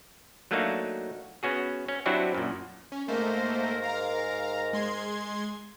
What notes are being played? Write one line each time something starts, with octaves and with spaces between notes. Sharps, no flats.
F#3 A3 A#3 D4 D#4 F#4
B3 C#4 F#4 G#4
C#4
F#3 C4 D4 E4 F#4 G4
F#2 A#2
C#4
G#2 A3 A#3 A#4 C5
F5 A#5
G#3 C6 G#6